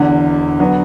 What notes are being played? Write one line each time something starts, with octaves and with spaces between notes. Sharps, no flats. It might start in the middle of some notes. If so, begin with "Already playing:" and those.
Already playing: E1 E2 D3
D3 F#3 B3